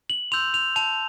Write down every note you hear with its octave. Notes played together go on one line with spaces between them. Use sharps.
F#7
C6 E6 G6 F7
F7
A5 F7